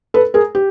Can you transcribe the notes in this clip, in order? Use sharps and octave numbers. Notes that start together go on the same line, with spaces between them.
A4 B4
G#4 A#4
G4